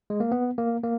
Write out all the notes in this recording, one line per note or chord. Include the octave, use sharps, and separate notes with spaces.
G#3
A#3
B3
A#3
A#3